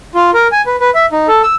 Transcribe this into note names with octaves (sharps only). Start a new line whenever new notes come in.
F4
A#4
G#5
B4
B4
E5
D#4
A4
E6